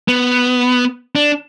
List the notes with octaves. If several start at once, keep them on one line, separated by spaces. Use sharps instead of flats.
B3
D4